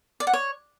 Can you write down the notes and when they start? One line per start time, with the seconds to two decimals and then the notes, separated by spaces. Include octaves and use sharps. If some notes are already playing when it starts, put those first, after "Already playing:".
0.20 D5
0.27 F#5
0.33 C#5